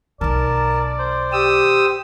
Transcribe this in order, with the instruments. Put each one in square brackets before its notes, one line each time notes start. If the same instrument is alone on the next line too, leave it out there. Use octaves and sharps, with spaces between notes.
[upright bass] B1 D#3 [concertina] A#4 A5 [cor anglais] D5
[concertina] C5
[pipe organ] G4 D#6 E6